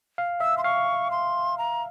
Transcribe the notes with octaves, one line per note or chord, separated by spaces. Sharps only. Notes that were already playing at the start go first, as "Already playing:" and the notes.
F5
E5 E6
C6
F5 C#6
C6
A#5